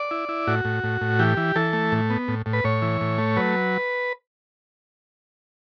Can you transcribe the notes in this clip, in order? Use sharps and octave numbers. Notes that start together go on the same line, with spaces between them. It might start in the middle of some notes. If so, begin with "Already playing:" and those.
Already playing: D5
E4
E4
A2 F#4
A2
A2
A2
E3 G4
E3
E3 A4
A3
A2
B3
A2
A2
B4
A2 C#5
E3
A2
A3
F#3 B4